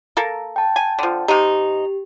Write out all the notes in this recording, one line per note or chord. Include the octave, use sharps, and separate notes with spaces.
A#3 A4 A#4
G5 A5
G#5
D3 F3
C3 D#4 G4